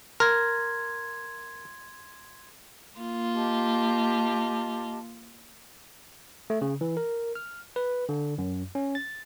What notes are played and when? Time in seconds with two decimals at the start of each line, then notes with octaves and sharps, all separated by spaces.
0.20 A#4 C6 G#6
2.99 A#3 F4
3.34 G4 D#5 A5
6.50 A3
6.61 C#3
6.81 E3
6.97 A#4
7.35 F6
7.76 B4
8.09 D3
8.38 F#2
8.75 C#4
8.95 A6